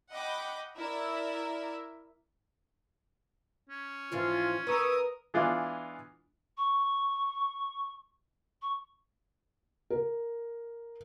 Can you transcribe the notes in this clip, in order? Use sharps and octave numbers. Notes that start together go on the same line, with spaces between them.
D#5 F#5 G5 B5 D6
E4 A#4 D5 E5
C#4
G#2 E3 F3 F4
A#4 B4 C#6 D#6 E6
E3 G#3 B3 D4 F4 D5
C#6
C#6
A#4